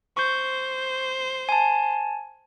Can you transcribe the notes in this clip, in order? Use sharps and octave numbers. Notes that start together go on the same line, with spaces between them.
C5 C#6 G6
G#5 A5